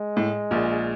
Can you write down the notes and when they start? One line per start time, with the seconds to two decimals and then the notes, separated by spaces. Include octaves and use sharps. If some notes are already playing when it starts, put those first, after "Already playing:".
Already playing: G#3
0.17 A2
0.51 A#1 A#2